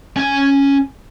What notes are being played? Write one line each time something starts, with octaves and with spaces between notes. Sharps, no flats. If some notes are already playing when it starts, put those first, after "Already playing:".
C#4 G#5